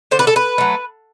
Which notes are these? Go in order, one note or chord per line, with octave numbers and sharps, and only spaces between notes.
D3 C5
B4
A4
B4
F#3 A3